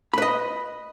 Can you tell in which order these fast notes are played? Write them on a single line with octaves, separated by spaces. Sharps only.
B5 B4 D#5